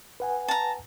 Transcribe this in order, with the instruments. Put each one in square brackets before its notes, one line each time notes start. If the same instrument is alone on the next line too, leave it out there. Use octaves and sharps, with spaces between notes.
[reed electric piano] B4 F#5 G#5
[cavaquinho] A5 A#5